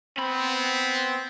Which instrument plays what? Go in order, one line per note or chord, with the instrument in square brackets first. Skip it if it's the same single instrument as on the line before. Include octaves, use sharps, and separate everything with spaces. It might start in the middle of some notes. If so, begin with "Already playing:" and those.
[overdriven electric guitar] B3 B5 [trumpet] C4